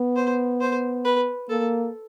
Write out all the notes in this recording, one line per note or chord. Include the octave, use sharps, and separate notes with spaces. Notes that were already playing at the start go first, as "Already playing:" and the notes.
Already playing: B3
C5
C5
B4
A#3 A4